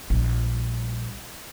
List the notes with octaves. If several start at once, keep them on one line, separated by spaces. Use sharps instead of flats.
A#1 G3